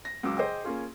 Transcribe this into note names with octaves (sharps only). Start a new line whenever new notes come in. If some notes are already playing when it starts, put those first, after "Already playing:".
A#6
C#2 C#3 F#3 D6 E6
G#4 C5 D#5 G5 D6
A#3 C#4 F4 G#4